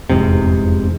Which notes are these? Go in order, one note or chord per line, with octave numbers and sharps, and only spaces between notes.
F1 E2 G#2 C3